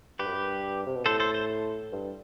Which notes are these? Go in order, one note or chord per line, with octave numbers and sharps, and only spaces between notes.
G2 G4 B4
F#2
G2
C3
B2
A2 A4 C5
A4 C5
A4 C5
G2